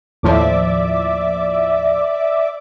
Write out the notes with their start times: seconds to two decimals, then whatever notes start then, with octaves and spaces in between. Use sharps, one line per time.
0.23 D#2 A2 F3 D5 E5 D6